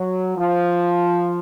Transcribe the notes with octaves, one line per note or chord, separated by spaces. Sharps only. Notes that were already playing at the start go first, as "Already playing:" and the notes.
Already playing: F#3
F3